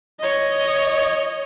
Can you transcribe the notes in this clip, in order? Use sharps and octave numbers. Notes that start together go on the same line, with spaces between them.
C#5 D#5